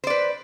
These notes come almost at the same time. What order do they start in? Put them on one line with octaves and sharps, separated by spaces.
C5 D5 B4